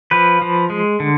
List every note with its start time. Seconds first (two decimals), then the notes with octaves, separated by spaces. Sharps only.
0.11 F3 B4
0.42 F3
0.70 G#3
1.00 D3